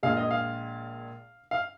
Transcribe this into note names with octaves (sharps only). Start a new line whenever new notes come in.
A#1 A#2 G#3 F5
D#5
F5
F5